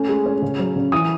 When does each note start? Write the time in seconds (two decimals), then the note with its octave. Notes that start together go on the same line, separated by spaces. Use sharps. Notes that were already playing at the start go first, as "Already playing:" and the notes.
Already playing: A3 C#4
0.09 G#3
0.26 C#4
0.42 C#3
0.59 F#3
0.76 C#3
0.92 E3 D#6